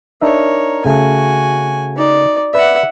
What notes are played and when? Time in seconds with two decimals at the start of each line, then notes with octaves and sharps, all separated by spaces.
0.21 D4 D#4 A#4 C#5 E5
0.85 C#3 A3 F#4 G#5
1.96 D#4 D5
2.54 B4 D5 E5 F#5